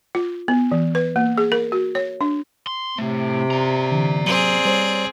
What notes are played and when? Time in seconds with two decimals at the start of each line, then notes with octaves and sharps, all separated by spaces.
0.15 F4
0.48 B3
0.72 E3
0.95 B4
1.16 A#3
1.38 G#4
1.52 A#4
1.72 F#4
1.95 C#5
2.21 D4
2.67 C6
2.98 A2 C3 A3
3.51 D5 A#5
3.92 D3 E3
4.26 F#3 C4 G#4
4.65 G3 C5 C#5